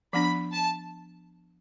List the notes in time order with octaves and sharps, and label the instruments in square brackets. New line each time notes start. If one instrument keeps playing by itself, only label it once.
[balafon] F3 B3 D4 [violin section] B5
[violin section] A5